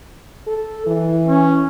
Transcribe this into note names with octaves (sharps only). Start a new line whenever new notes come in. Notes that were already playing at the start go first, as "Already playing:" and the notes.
A4
E3
C#4